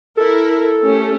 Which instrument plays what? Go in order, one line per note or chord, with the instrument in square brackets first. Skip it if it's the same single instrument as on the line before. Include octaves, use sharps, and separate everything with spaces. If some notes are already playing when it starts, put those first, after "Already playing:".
[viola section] E4 A#4 [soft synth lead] A4
[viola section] A3 C#4 G4